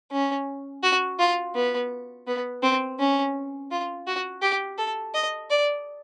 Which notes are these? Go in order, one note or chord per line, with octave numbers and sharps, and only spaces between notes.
C#4
F#4
F4
B3
B3
C4
C#4
F4
F#4
G4
A4
D#5
D5